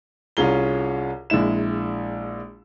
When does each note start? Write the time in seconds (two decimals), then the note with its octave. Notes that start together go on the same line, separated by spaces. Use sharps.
0.37 C2 C#4 F4 G#4 A#5 G7
1.30 A#1 G#3 E4 E7